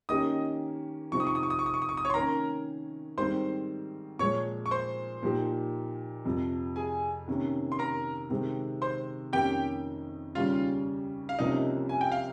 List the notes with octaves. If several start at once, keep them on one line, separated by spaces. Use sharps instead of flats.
D#3 A#3 C#4 G4 D#5 D#6
C3 F3 C4 D#4 C#6
D#6
C#6
D#6
C#6
D#6
C#6
D#6
C#6
D#6
C#6
D#6
C#5 C#6
C6
D#3 A#3 C#4 A#4 A#5
G#2 D#3 G3 C4 C5 C6
A#2 F3 G#3 C#5 C#6
C#6
C5 C6
A#2 F3 A#3 D#4 G4
F2 C3 F3
G#4 G#5
C3 D#3 A#3 C#4
C6
A#4 A#5
C3 D#3 G#3 C4
C5 C6
F2 D#3 A#3 C#4 G4 G5
D#2 C#3 G3 C#4 F4 F5
F5
C2 C3 F3 A#3 C#4 D#4 D#5
G#5
G5
F5